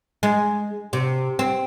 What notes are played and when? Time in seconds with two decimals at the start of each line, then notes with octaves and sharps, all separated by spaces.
0.23 G#3
0.93 C3
1.39 C4